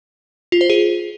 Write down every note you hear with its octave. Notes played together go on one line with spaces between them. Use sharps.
F4
C5
G#4